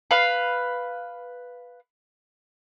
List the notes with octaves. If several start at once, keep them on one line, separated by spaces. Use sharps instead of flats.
B4 F5